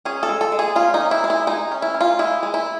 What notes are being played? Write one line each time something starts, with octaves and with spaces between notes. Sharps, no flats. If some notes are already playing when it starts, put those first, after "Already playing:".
C#4 G#4
A4
G#3
A4
G#3
G#4
C#4 F4
D#4
C#4
E4
G#3
E4
G#3 D#4
C#4
E4
C#4
F4
G#3 E4
G#3
E4